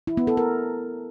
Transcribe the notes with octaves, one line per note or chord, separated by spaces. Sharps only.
E4
B3
A4
A#4